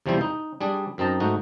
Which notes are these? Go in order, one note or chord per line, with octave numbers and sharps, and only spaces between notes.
E2 C3 F3 G3 E4 C5
D#4
G3 D4 G#4
F#2 C4 D#4 A5 A#5
G#2 A3 D#4 F#4